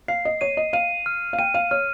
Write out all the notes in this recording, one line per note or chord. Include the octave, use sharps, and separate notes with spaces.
F5 C7
D#5
C#5 D#7
D#5
F5 D#7
F6
F5
G5 D#7
F5
C#5 F6